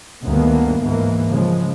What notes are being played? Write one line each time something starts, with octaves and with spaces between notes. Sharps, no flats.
D2 G2 D3 D#3 A#3 B3
D2 G#2 E3 A#3
C#3 F3 G#3